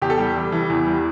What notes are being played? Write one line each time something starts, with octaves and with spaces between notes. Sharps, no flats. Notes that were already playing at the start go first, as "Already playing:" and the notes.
E2 G4
A4
G3 G4
E3
E3
E2
G3